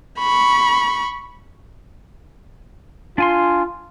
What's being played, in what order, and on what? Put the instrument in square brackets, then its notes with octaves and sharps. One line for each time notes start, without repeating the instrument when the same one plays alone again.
[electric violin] B5 C#6
[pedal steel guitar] D4 G#5 C6 [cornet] F4